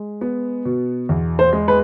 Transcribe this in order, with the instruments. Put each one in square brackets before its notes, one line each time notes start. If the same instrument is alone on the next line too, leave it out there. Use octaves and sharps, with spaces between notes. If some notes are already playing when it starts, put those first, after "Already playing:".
Already playing: [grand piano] G#3
B3
B2
E2
[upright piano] C5
[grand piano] G#3
[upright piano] B4